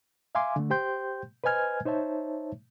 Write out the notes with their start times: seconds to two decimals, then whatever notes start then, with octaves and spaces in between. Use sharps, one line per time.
0.35 E5 F5 G#5 C6 D6
0.56 D3 A3
0.70 G4 C5 G5 C6 G6
1.44 B4 C5 D#5 G#5 F6 G#6
1.85 D#4 C5 C#5 E5 A5